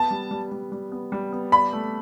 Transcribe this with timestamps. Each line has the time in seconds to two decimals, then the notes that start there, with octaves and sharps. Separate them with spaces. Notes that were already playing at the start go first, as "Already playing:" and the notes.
Already playing: B3 A5
0.11 G3
0.31 G3
0.51 G3
0.72 G3
0.92 B3
1.12 G3
1.32 B3
1.52 D5 B5
1.73 A3